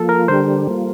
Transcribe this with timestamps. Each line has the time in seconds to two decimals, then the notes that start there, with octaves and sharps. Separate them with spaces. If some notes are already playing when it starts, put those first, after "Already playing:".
Already playing: F3 A#3 F4 A4
0.09 A#4
0.28 D3 G3 D4 G4 C5
0.67 G3 A#3 F4